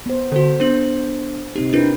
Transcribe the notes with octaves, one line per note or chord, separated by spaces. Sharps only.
B3 C5
D3 F#4 A4 C5
B3 D4 C5 F#7
C3 C4 D#4 G4
D4 E4 G4 A#4 B4